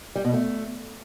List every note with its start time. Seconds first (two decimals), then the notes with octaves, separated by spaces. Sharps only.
0.16 G3
0.25 B2
0.34 A3